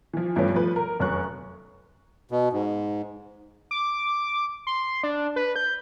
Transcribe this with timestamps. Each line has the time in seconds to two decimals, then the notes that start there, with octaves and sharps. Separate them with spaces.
0.13 E3 F3
0.36 G2 E3 F3 A3 B3 C#4
0.54 F3 A3 B4
0.76 A#4
1.00 F1 F#2 C#4 C#6 F#6
2.31 B2
2.53 G#2
3.71 D6
4.67 C6
5.03 D4
5.36 B4
5.56 G6